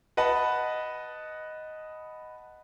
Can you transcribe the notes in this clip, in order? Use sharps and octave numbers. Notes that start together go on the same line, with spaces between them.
B4 D#5 F#5 A5 B5